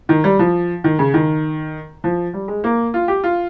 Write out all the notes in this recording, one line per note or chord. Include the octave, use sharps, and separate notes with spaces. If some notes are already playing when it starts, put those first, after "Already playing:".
D#3
G3
F3
D#3
C#3
D#3
F3
G3
G#3
A#3
F4
G4
F4